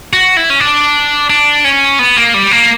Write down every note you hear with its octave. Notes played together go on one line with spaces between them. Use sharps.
F#4
E4
C#4
D4
D4
C#4
B3
A#3
G3
A#3